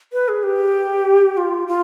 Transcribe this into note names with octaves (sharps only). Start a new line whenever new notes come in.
B4
G#4
G4
F4
F4